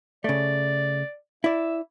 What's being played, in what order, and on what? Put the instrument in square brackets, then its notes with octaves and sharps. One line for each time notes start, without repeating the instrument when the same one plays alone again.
[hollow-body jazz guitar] C#3 A3 [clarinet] D5
[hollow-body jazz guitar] E4 D5 [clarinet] E5